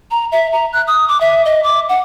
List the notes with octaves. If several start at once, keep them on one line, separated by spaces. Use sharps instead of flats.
A#5
E5
A#5
F#6
D#6
D6
E5
D#5
D6
F#5